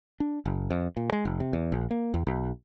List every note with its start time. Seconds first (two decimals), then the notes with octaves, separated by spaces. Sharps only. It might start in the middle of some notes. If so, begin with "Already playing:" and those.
0.20 D4
0.46 F#1
0.70 F2
0.97 A#2
1.12 G#3
1.25 F1
1.40 C3
1.53 E2
1.72 A#1
1.91 A#3
2.14 E2
2.27 B1